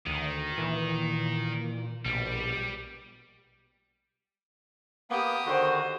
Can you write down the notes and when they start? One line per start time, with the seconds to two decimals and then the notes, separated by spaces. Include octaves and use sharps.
0.07 D2 D#3
0.58 A#2 E3
2.05 A#1 B2 G3
5.10 A#3 B3 G4 D#6
5.46 D3 D#3 F#4 C5